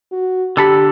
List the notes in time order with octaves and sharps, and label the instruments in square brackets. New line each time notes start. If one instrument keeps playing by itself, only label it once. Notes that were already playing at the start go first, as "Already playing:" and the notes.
[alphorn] F#4
[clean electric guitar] D3 A4 B5 [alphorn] G4